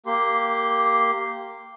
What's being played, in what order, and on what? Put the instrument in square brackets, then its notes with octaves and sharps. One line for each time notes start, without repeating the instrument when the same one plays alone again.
[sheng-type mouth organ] A#3 G4 C6